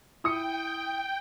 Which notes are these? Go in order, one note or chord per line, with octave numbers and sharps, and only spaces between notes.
E4 G5 D#6 C#7